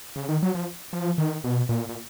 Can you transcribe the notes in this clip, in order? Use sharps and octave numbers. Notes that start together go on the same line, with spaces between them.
C#3
D#3
F#3
F3
F3
D#3
B2
A#2
A#2